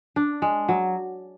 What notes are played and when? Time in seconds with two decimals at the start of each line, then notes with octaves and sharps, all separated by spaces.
0.16 D4
0.42 G#3
0.69 F#3